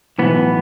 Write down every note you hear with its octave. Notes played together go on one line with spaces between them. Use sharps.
B1 A2 E3 B3